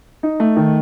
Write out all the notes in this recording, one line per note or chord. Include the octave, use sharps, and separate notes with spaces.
D#4
A3
D#3